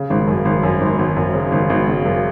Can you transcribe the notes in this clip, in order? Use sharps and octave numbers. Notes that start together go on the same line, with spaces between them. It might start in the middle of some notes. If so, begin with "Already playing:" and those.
Already playing: C#3
G#1
F#2
G#1
F#2
G#1
G#1
F#2
C#3
G#1
G#1
C#3
F#2